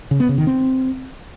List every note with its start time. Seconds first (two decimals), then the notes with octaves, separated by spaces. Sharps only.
0.11 C#3
0.20 B3
0.29 C#3
0.38 D#3
0.47 C4